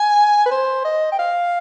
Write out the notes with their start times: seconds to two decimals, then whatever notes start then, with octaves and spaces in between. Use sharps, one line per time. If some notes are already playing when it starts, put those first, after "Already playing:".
Already playing: G#5
0.46 B4
0.51 C5
0.85 D#5
1.12 G5
1.19 F5